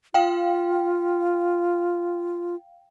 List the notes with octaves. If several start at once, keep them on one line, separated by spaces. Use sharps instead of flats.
F4 F5 G5